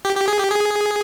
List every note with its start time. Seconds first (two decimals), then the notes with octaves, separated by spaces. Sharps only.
0.05 G4
0.16 G4
0.28 G#4
0.39 G4
0.50 G#4